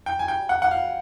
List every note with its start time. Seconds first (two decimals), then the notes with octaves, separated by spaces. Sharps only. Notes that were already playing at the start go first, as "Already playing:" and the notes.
0.06 G5
0.19 G#5
0.28 G5
0.49 F#5
0.62 F#5
0.71 F5